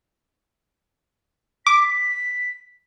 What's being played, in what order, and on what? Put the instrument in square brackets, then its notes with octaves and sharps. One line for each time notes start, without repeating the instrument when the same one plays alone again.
[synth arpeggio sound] D6 [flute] B6